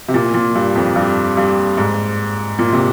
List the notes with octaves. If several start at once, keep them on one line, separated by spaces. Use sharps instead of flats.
C3
A#2
A#2
G2
F2
G2
G2
G#2
A#2
C3